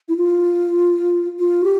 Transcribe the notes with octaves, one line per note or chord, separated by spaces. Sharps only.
E4
F4
F4
G4